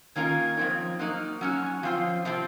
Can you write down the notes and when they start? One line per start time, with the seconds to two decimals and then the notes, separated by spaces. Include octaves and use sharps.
0.16 D#3 A#3 C#4 F4 A#4 G#6
0.57 F3 C4 D#4
0.99 F#3 A#3 D#4 F#6
1.14 F6
1.27 F6
1.41 F#3 C#4 F#4 F6
1.52 F6
1.63 G#5
1.73 F#5
1.83 F3 C4 F4 C6
2.25 C3 F3 C4